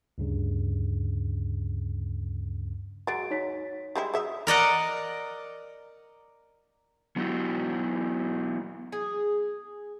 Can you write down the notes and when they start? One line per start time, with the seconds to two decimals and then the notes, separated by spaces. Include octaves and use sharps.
0.18 D2 G2 C#3
3.07 F#3 G#3 A6 D7
3.31 D#4 C#5 B6
3.96 G3 G#3 E4
4.14 F#3 G#4 E5 D#6
4.47 A#4 D5 D#5 F#5
7.16 F#3 B3 E4 F#4 G4
8.92 G#4